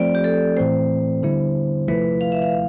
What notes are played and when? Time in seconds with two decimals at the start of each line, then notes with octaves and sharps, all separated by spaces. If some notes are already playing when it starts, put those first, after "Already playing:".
Already playing: F3 A3 C4 D5
0.15 G4
0.24 A4
0.57 A2 E3 A3 C4 C5
1.23 D3 G3 B3 E4
1.88 C3 F3 A3 E4 B4
2.21 F5
2.32 E5
2.42 F5